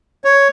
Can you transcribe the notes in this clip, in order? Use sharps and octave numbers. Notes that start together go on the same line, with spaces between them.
C#5